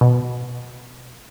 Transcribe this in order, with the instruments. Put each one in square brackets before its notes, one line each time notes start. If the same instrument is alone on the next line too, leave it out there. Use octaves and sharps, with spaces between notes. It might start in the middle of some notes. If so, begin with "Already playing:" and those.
[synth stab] B2